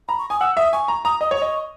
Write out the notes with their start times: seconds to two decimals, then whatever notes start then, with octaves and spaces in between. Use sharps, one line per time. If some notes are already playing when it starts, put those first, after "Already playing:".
0.08 A#5 B5
0.19 C#6
0.30 G#5 D#6
0.40 F#5 E6
0.57 E5 D#6
0.73 G#5 C#6
0.88 A#5
1.05 A#5 D#6
1.21 D#5 D#6
1.31 C#5
1.37 C#6
1.42 D#5